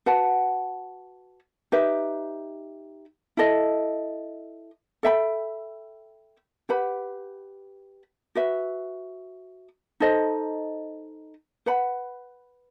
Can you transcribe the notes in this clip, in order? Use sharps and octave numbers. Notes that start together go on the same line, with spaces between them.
F#4 B4 F#5 A5
D#4 G4 B4 E5
E4 A4 D#5
A4 E5 G5 B5
G4 B4 F#5 B5
F#4 B4 E5
D#4 A4 C5 D#5
B4 F#5 B5